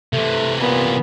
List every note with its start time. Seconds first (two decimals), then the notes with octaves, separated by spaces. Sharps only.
0.13 C3 E3 A3
0.60 A#2 B3